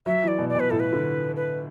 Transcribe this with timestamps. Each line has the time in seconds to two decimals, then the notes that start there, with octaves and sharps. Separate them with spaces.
0.06 F#3 E5
0.23 E3
0.28 D5
0.38 B2
0.49 D5
0.55 B2 B4
0.70 A2 A4
0.80 B4
0.93 D3
1.36 B4